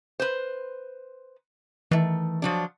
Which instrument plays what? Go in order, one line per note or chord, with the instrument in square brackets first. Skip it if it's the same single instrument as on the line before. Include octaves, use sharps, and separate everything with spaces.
[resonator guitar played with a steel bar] B4 C5
[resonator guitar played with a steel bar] D#3 A3 [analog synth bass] E3
[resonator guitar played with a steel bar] F3 F#3 D4